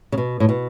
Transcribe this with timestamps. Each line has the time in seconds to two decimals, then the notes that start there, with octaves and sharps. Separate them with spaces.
0.12 C#3
0.18 B2
0.40 A2
0.49 B2